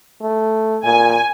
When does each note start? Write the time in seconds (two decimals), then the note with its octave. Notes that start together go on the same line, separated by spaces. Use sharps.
0.22 A3
0.85 A#2 G#5